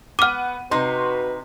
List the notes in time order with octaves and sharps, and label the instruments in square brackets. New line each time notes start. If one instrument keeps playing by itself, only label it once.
[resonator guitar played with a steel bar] B3 [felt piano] F#5 D#7 [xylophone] D6 F6
[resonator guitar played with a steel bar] C3 D#4 [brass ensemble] F#4 B4 [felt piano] C6